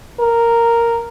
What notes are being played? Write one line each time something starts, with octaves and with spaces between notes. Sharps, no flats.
A#4